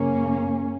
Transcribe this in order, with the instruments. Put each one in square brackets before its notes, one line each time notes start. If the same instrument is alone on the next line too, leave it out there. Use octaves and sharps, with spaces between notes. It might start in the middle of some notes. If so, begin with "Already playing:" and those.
Already playing: [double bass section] F#2 C#3 A#3 C#4